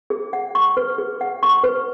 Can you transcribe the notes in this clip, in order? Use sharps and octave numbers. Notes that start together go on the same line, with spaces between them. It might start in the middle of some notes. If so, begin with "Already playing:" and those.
G#4
F#5
C#6
B4
G#4
F#5
C#6
B4